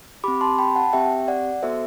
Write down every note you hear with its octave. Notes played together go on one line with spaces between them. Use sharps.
C4 G4 B5 D6
A5 C6
G5 B5
F#5 A5
C4 G4 E5 G5
D5 F#5
B3 F#4 A4 C5 E5